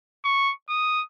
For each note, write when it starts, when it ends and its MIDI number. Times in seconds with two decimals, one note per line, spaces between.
0.25 0.53 85
0.69 1.03 87